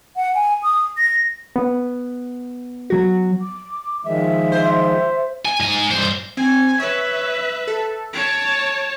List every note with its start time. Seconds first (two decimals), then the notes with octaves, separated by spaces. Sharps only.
0.16 F#5
0.35 G#5
0.63 D#6
0.98 A#6
1.56 B3
2.90 F#3 F#4
3.41 D6
4.05 D#3 F3 G#3 E5
4.52 C5
5.45 G#5
5.60 G#2 G#5
5.91 G2 C5
6.37 C4 G#5
6.80 B4 C#5 E5
7.67 A4
8.13 C#5 A5 D7